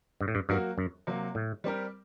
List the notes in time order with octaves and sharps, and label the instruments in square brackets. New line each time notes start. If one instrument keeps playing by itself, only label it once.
[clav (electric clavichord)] G2
A2
G2
[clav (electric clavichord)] G2 [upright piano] F#3 A#3 F#4 A#4
[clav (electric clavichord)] F#2
[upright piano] C3 F#3 A#3
[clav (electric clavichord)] A2
[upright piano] G3 C4 G4 A#4